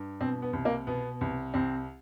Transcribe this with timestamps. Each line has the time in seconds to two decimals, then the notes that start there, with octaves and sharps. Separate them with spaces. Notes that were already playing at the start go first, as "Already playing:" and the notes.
Already playing: G2
0.21 B2 C4
0.42 B3
0.53 C2
0.65 A#3
0.87 B2 B3
1.21 C2
1.54 C2 C4